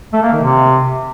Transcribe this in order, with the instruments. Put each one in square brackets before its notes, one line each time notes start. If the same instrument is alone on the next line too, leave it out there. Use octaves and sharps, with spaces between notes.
[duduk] A3
A#3
D#3
C3